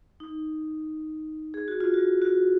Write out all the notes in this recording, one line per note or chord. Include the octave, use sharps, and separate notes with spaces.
D#4
G#4
F#4
F4
F#4
F#4